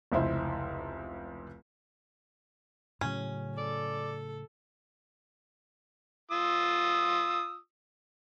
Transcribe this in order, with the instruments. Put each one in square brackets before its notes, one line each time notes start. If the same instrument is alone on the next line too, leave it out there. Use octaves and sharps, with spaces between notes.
[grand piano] F1 C#2 E4 C5
[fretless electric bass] A2 C#3 F#3 [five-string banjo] C#4
[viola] A4 [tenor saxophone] D5
[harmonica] F4 D#6 E6